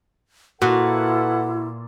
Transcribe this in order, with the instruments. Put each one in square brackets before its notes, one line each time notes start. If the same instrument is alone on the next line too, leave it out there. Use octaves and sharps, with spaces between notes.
[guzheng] A#2 [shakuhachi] E4 [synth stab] F#4 [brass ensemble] A4 B4 F#5